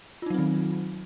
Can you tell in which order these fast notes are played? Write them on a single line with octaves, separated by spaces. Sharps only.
F4 D#4 F#3 C4 D#3